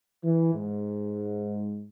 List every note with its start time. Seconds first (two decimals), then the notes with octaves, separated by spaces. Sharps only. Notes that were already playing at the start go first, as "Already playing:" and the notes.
0.24 E3
0.54 G#2